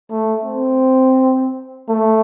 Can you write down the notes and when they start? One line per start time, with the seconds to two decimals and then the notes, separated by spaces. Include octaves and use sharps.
0.11 A3
0.45 C4
1.89 A3